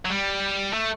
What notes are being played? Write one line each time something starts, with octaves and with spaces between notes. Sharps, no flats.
F#3
G3
A3